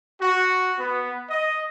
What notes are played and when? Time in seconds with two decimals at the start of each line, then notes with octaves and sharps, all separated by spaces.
0.21 F#4
0.80 B3
1.30 D#5